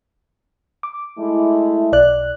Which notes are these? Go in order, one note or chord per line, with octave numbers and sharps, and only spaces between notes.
D6
G#3 A3 E4
B1 D5 F#6